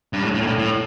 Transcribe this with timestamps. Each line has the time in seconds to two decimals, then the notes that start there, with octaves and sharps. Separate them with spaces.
0.13 G2
0.23 A2
0.34 A2
0.41 A#2
0.47 A2
0.59 A2